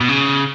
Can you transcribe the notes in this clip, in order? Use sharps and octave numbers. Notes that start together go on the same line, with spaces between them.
B2
C#3